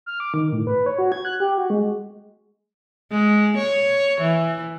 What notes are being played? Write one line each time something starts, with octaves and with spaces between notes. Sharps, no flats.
F6
D6
D#3
A2
B4
C#5
F#4
G#6
F#6
G4
F#4
G#3
G#3
C#5
E3